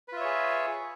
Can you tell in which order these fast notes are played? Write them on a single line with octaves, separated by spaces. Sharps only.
B4 F4 E5 C#5 G#4